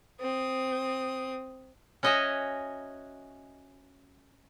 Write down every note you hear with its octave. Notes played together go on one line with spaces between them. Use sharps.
C4 D#6
C#4 F#4 D#5 E5 G#5 A#5